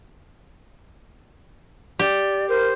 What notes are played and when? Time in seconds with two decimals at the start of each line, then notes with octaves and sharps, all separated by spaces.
1.99 G4 D5
2.49 A#4 C5